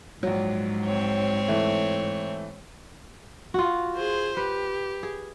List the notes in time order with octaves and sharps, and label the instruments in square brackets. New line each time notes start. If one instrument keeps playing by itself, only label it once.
[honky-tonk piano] A#1 F#3 [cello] G#2
[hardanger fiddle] C4 C#5
[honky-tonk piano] E3 A3
[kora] F4 F#4
[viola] G#4 C5
[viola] G4 [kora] B4
[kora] G#4